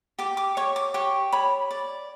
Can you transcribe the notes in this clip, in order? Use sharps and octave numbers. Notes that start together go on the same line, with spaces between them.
G4 D6
D6
C#5 C#6
D6
G4 C#6
C#5 B5
D5